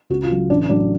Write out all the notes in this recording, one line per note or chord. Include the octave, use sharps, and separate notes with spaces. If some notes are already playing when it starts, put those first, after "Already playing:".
C#2 F#4
F4
C#3 F#3
A1 D4
A2 F#3 D4